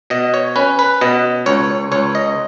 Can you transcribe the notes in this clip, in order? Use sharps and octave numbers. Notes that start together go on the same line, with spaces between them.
B2 D#5
C#5
C#4 B4
B4
B2 D#5
C#2 C#5
C#2 C#5
D#5